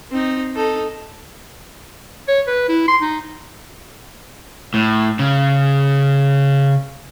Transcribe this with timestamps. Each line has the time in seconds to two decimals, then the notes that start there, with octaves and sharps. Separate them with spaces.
0.11 C4 D#4
0.56 D#4 A4
2.28 C#5
2.47 B4
2.69 E4
2.88 C6
3.02 D#4
4.74 A2
5.19 C#3